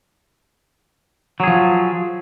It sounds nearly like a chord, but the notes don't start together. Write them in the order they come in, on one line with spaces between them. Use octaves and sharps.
F#3 G#4 F3